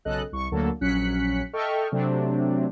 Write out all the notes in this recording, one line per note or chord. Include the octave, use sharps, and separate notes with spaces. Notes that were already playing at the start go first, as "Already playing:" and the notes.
B1 C#3 A4 D#5 F#6
C2 C#6
D2 D3 F#3 A#3 A4
A#1 F#3 C#4 F#6 B6 C#7
A4 D#5 E5 G5 C#6 F6
C3 F#3 A3 C4 D4